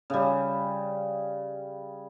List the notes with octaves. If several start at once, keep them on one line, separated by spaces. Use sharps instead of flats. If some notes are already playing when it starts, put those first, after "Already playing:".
C#3 G3